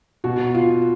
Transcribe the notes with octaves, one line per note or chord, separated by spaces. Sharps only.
B2 F#4
F4